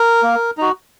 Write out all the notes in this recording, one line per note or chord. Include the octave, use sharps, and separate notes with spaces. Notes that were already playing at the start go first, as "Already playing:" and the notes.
Already playing: A#4
A#3
D#4 F#4